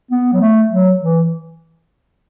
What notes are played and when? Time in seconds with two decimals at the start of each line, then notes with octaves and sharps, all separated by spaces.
0.11 B3
0.33 F#3
0.41 A3
0.71 F#3
1.01 E3